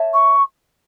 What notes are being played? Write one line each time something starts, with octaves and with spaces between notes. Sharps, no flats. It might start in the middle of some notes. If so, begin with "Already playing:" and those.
Already playing: C#5 E5 A5
C#6